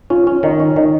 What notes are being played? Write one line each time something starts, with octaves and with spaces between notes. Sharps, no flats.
C#4 F4
C#4
D#3 D#4
C#4
D#3 D#4